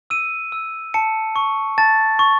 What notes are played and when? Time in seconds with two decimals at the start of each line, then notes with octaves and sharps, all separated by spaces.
0.10 E6 D#7
0.52 E6
0.94 A5 C#7
1.36 C#6
1.78 A5 A6
2.19 C#6